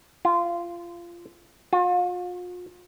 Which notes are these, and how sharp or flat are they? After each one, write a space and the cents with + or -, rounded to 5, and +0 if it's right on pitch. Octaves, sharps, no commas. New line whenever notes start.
F4 -20
F4 +40